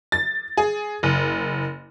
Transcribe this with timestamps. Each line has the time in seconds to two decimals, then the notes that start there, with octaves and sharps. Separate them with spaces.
0.12 A6
0.57 G#4
1.03 F#1